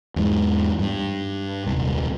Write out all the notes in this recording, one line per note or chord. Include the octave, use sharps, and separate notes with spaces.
E2 G#2
G2
D#1 C2